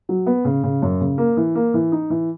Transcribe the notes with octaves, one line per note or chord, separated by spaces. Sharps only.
F#3
B3
C#3
C#3
F#2
C#3
A#3
E3
A#3
E3
D#4
E3